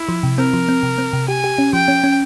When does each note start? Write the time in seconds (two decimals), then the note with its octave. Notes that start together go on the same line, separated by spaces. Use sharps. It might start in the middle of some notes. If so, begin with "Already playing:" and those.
Already playing: E4
0.09 F3
0.23 C3
0.38 C4 A#4
0.53 F3
0.69 C4
0.83 C3
0.98 C4
1.13 C3
1.28 G4 G#5
1.44 G4
1.58 C#4
1.73 F3 G5
1.88 C#4
2.04 C#4